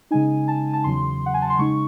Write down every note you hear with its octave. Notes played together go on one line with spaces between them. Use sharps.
C#3 G#3 D#4 G#5
A5
A5
E2 C#3 F#3 C6
F#5
G#5
A5
C6
C#3 G#3 D#4 C#6